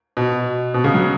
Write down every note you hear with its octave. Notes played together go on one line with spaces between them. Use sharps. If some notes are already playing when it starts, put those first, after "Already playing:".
B2
B2
C#3
F#3